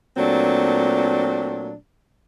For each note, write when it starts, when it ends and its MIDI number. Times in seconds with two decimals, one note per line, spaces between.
0.17 1.73 46
0.17 1.73 54
0.17 1.73 57
0.17 1.73 60
0.17 1.73 62